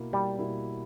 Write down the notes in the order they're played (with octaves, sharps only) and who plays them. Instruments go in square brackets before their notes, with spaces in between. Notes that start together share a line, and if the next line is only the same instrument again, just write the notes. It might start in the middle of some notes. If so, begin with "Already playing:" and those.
Already playing: [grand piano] B2 A#3 E4
[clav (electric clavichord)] G3
[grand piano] B2 A#3 E4